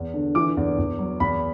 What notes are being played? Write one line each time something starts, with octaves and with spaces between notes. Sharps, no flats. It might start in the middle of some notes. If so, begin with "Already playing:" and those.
Already playing: E2
D3
E3 D6
E2
E2
F#3
E2 B5